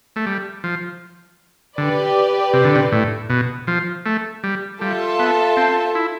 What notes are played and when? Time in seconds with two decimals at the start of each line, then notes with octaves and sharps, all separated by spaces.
0.16 A3
0.26 G3
0.64 F3
1.78 D3 G4 B4 D5
2.53 C3
2.65 D3
2.75 C3
2.92 A2
3.30 B2
3.67 F3
4.06 A3
4.44 G3
4.81 G3 F4 A4 E5 A5
5.19 B3
5.57 C4
5.95 E4